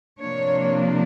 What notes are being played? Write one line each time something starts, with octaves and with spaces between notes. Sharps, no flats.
C3 F3 A#3 D4 C#5